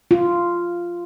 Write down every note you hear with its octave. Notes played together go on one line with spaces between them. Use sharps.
F4